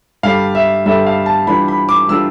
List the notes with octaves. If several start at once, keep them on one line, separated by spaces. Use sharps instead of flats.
G2 D3 G3 F5
E5
G2 D3 G3 E5
F5
A5
E3 G3 D4 F4 B5
B5
D6
E3 G3 D4 F4 E6